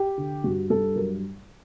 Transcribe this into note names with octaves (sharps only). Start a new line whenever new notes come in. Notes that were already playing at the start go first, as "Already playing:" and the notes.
Already playing: G4
D3
G2 F#4
G2 A4
F#3 A#4